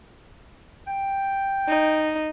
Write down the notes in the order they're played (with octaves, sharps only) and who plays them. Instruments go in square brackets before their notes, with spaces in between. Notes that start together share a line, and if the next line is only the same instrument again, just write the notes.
[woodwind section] G5
[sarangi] D#4